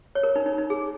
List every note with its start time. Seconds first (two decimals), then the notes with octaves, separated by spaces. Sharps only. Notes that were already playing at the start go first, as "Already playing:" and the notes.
0.15 C#5
0.23 A#4
0.36 D#4
0.46 D#4
0.58 D#4
0.70 G#4